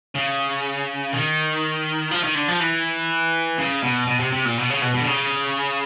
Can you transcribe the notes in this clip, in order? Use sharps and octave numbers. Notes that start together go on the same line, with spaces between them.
C#3
D#3
F3
D#3
D3
F3
E3
C#3
B2
B2
C3
C3
A#2
B2
C#3
B2
B2
D3
C#3